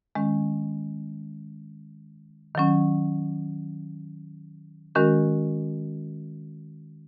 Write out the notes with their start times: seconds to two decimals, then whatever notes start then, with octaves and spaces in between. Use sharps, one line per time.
0.15 D#3 G#3 C#4
2.55 D#3 F#3 C#4
4.95 D#3 G#3 C#4 F#4 A#4